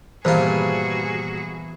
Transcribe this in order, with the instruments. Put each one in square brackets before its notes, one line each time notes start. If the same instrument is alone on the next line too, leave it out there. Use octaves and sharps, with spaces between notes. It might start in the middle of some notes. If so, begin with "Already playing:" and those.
[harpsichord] G2 A#2 F4 [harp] E3 B3 [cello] F#4 G#4 [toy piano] C5